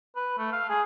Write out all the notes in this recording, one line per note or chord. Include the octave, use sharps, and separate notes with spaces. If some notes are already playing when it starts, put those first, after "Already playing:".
B4
A3
F5
G#4